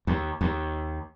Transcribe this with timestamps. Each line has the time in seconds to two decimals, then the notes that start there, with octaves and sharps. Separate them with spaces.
0.07 D#2
0.41 D#2